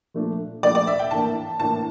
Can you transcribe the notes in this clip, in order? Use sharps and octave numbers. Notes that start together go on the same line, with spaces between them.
A#2 F3 A3 D4
A#2 F3 A3 D4 D5
D5
E5
G5
A2 E3 A#3 D4 A5
A2 E3 A#3 D4 A5